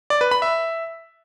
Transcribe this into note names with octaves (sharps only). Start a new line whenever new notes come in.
D5
B4
B5
E5